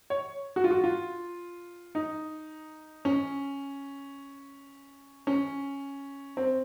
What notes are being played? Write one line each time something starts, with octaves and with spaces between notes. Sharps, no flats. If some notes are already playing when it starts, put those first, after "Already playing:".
C#5
F#4
F4
F#4
F4
D#4
C#4
C#4
C4